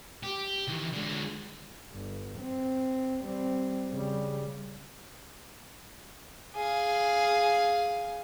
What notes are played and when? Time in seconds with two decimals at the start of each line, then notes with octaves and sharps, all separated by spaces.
0.23 G4
0.68 D#3 E3
0.93 D3 G#3
1.92 G1
2.40 C4
3.22 G3 C4
3.92 C#3 G3
6.56 G#4 F5